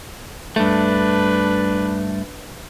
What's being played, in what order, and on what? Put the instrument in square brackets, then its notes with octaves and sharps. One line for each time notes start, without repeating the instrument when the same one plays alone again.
[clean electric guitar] G2 A3 [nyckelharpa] D4 B4